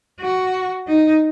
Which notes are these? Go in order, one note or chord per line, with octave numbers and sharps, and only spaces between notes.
F#4
D#4